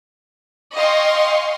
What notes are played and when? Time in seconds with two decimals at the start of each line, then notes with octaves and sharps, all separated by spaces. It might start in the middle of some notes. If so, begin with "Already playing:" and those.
0.76 D#5 F5 G5 G#5 C6 C#6